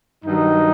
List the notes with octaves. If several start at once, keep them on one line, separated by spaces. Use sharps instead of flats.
G2 D#3 F#3 D#4